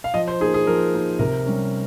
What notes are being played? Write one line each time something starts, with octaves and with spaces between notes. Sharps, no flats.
F5
F3 D#5
C5
A#3 D#4 G#4
G#4
F3 A#4
A#3 D#4
C3 A#4
G3 C#4